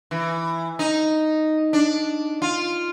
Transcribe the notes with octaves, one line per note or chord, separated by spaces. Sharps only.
E3
D#4
D4
F4